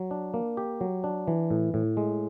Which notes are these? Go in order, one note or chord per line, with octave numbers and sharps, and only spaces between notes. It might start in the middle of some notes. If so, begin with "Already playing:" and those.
Already playing: F#3
D4
A#3
G4
F#3
D4
E3
A2
A2
G#3